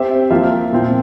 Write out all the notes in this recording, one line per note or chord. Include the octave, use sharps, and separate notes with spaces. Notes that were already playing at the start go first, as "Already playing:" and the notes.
Already playing: C4 G4 C5 E5
F3 A#3 F4 A#4 E5
A#2 F3 C4